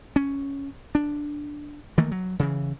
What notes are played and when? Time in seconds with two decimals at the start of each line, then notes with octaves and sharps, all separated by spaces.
0.16 C#4
0.95 D4
1.98 D#3 E3 A3 A#3
2.12 F#3
2.39 C#3 E3